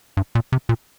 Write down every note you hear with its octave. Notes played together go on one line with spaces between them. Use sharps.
G2
A#2
C3
A#2